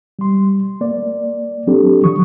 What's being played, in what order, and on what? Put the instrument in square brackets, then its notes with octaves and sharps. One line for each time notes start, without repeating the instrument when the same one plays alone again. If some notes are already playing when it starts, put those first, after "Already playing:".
[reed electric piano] G3 C6
A#3 D5
F#3 C4 D4 G4 A4
D#3 F3 F#3 C#6 D#6